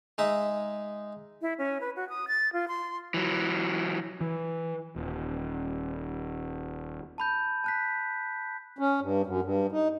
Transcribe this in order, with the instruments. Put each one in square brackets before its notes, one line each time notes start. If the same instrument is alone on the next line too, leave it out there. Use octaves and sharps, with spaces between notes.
[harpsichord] G#3 D#4 E5 D#6
[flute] E4
C#4
B4
F#4
D#6
A6
F4
C6
[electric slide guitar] E3 F#3
[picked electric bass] E3
D#1
[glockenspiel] A5 B5 G6
A5 F#6 B6
[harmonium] C#4
G2
F#2
G2
D#4